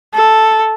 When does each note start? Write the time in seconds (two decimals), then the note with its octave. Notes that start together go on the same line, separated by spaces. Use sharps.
0.14 A4